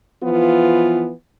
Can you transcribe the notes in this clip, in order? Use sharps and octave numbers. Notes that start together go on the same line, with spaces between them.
E3 F3 B3 F4